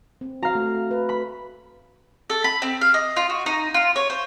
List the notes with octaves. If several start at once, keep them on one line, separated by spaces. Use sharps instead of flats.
C4
F#4 F5 A#5
A3
B4
B5
A4
B5
C4
F5
D#5
F4
F#4
D#4
F4
C#5
C5